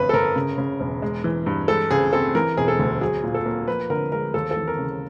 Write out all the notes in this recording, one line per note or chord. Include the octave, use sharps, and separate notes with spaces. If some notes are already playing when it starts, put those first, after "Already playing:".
Already playing: G1 F2 B4
A4
G1 A#4
C#3
C#3
E1
G#3
E3
G2
G#3 A4
C#2 G#4
C4 A4
E3 A#4
E1 G#4
A4
D2
F#3 G#4
A#2
A4
A#3
F3 B4
D3 A#4
G#3 A#4
D#2 A4
A4
E3
A#4
C#3